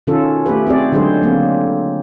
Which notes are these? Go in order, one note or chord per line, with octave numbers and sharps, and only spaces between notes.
B2 D#3 C#4 F4 A4
A3 B3 F#4 G4 B4
C4 F#4 G#4 D5
D3 F#3 G#3 G#4 C5
F#3 A#3 C4